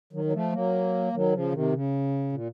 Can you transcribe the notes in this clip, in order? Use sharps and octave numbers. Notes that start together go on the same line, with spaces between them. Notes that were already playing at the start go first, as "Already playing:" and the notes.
D#3 F#3
F#3
F3 A3
F#3 A#3
D#3 F#3
C#3 F3
C3 D#3
C#3
A#2